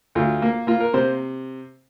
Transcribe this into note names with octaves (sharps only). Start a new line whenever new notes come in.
D2 F4
A#3
A#3 F4
A#4
C3 C5